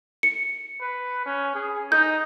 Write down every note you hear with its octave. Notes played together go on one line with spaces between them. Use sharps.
C#7
B4
C#4
G#4
D#4 G6